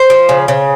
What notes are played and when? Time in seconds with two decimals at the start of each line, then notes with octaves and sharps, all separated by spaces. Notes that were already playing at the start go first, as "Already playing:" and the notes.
Already playing: C5
0.10 F3
0.29 C#3
0.48 C#3